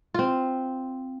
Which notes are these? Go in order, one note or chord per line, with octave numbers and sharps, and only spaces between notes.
C4 F4